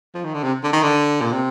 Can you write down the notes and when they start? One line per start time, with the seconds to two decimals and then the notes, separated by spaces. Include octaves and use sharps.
0.14 F3
0.25 D#3
0.34 D3
0.43 C3
0.63 D3
0.73 D#3
0.83 D3
1.21 A#2
1.32 C3